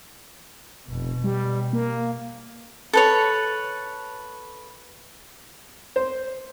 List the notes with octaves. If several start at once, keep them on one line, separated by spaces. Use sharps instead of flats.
F1 B2
G3
A#3
A4 B4 C#5
C5